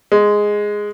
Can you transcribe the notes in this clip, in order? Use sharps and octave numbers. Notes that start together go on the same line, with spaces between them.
G#3